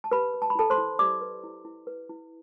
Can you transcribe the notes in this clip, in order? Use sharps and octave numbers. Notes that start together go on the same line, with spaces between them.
A5
G4 B4 B5
B4
A5
B5
E4 A4 A5
C5 C6
E4
G4 D5 D6
B4
E4
E4
B4
E4